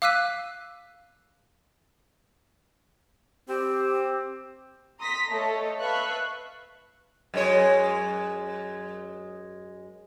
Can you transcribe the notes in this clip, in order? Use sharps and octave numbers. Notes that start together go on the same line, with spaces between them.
F5 D6 E6 F#6 B6 D#7
C4 G4
A#5 C6 D#6 A#6 B6
A3 A4 C#5 D#5
B4 E5 F5 A5 C#6 F#6
F#2 G#3 C#5